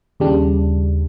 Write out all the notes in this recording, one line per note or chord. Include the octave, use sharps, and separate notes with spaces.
D#2 C#3 G3 D4